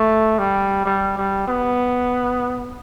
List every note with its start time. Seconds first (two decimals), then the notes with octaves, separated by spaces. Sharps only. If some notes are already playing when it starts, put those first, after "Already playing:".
Already playing: A3
0.39 G3
0.85 G3
1.17 G3
1.48 B3